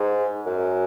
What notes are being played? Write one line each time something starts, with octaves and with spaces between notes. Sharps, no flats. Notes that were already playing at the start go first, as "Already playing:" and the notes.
Already playing: G#2
F#2